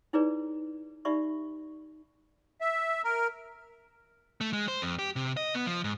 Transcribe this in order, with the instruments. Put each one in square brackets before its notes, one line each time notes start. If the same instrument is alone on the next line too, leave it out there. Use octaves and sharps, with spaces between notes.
[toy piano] D#4 E4 G#4 B4 C#5 D5
D#4 G4 D5 E5 B5 C#6
[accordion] E5
A#4
[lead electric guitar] A3
G#3
C5
F2
G4
C3
D#5
B3
F3
G#2